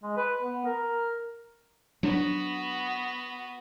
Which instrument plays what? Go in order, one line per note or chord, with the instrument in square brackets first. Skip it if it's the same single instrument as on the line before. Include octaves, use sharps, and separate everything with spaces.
[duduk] G#3
B4
B3
A#4
[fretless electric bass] F#3 D4 [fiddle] B3 F#4